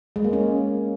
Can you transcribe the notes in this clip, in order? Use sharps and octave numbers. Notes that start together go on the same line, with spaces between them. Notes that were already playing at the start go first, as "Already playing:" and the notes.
G#3
A#3
C#4